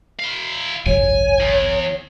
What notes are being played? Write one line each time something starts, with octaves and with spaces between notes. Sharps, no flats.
E4 F5
G#1 C#2 F#2 C#5 G#5
E2